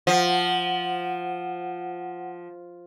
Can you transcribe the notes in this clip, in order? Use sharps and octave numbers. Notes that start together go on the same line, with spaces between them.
F3 F#5